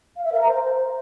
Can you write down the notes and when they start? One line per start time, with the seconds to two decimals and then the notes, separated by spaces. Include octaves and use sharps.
0.16 F5
0.24 E5
0.32 A#4
0.40 A#5
0.47 C5